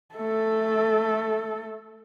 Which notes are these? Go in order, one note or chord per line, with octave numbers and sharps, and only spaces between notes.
A3 A4